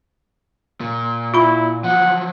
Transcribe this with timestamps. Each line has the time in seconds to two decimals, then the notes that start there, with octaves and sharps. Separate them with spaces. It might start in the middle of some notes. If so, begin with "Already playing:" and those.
0.81 A#2
1.34 E4 F4 B5
1.84 F3 F#3 F#5